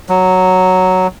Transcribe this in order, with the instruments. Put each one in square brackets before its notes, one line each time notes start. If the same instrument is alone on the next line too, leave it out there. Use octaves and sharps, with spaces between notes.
[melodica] F#3